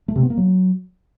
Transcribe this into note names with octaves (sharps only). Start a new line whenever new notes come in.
A3
C3
B3
A#3
F#3